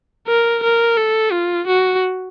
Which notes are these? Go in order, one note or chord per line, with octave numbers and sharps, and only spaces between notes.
A#4
A#4
A4
F4
F#4